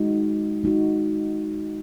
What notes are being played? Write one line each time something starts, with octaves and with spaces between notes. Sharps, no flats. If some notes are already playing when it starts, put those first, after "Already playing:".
Already playing: G#3 D#4 F#4
G#3 D#4 F#4